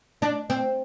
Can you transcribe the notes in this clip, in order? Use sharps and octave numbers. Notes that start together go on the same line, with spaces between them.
D4
C4